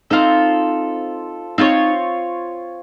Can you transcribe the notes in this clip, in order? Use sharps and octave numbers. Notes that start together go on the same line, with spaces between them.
C4 D#4 F4 A4
C4 D#4 F4 A#4 C#5